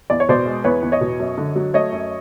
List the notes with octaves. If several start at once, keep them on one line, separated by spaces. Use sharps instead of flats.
E2 D5
C#5
B2 C5 D5
G#3
E2 B4 C#5
E2
C#5 D#5
B2
F#2
D3
F#3
A3 C#5 D#5
F#2